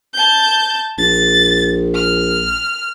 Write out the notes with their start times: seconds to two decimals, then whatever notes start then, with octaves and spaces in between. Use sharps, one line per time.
0.14 A5 G6
0.98 A#1 A6
1.95 F6